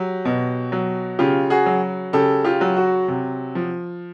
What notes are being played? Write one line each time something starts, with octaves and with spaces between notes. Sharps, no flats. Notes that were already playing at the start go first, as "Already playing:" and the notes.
Already playing: F#3 G4
B2
F#3
C#3 F4 G4
F#4 G#4
F#3
C#3 G4 A4
F4 G4
F#3
F#4
C3
F3